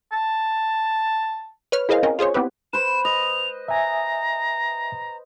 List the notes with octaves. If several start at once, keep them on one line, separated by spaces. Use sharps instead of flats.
A5
B4 C#5 F6
E4 G#4 A#4 C5 D#5 F5
C4 C#4 A#4 D#5
F4 G#4 C5 C#5
B3 C4 E4 G4 B4
B4 C5 E7
D#5 F7
E5 G#5 A#5